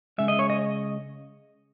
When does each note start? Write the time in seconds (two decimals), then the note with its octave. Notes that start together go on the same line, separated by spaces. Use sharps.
0.18 C#3 G#3 E5
0.28 D#5
0.39 C#5
0.50 D#5